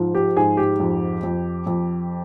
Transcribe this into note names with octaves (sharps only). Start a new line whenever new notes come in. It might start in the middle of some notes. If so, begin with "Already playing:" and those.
Already playing: G#2 F3
G4
G#2 G#4
G4
F2
F2
F2